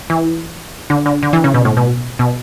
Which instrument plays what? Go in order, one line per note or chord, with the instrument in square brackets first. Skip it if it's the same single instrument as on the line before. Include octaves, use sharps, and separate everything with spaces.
[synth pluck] E3
D3
D3
D3
E3
C#3
B2
A2
B2
B2